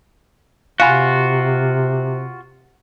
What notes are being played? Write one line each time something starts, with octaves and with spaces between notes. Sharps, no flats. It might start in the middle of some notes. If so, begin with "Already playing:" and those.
C3 F4 F#4 F5 G#5 B5